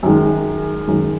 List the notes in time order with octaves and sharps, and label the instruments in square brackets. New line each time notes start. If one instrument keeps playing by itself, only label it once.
[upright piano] F#2 D#3 G#3
F#2 D#3 G#3